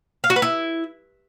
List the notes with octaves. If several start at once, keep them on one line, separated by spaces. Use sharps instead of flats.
F5
F#4
B4
E4